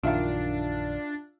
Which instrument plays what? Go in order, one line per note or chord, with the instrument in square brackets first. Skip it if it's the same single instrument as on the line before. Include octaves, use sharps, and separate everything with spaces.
[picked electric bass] A#1 F#2 D#3 [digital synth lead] D4 [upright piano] F4 E5 F5